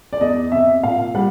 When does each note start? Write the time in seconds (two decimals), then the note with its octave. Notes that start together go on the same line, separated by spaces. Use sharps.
0.13 D5
0.21 E2 D#5
0.52 C3 E5
0.83 A#2 F5
1.15 G3 F#5